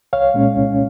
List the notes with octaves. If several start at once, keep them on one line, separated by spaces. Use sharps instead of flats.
C2 C#5 F5
A#2 G#3 C#4
C2